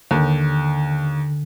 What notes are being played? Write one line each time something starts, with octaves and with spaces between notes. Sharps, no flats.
D#2 D3